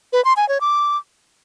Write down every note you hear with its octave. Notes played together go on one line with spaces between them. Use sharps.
B4
C6
G#5
C#5
D6